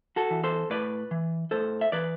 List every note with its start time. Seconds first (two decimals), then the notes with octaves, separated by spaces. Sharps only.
0.16 F#4 A4
0.30 E3
0.44 A4 C5
0.70 A2 B4 D5
1.11 E3
1.51 A2 A4 C5
1.81 E5
1.92 E3 B4 D5